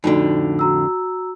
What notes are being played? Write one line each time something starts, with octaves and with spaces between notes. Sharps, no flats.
F2 A2 D3 D#4 F#4
F#4 A#5 E6